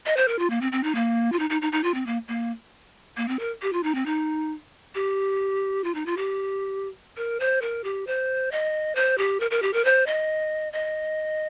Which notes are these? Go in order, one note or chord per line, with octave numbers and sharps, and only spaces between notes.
D#5
C5
A#4
F4
A#3
C4
C4
D#4
A#3
F4
D#4
D#4
D#4
D#4
F4
C4
A#3
A#3
A#3
C4
A#4
G4
F4
D#4
C4
D#4
G4
F4
D#4
F4
G4
A#4
C5
A#4
G4
C5
D#5
C5
G4
A#4
A#4
G4
A#4
C5
D#5
D#5